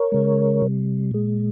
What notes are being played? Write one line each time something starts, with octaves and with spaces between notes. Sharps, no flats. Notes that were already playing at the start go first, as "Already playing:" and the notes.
Already playing: A#4 C#5
C#3 G#3
C3 G3
A#2 G#3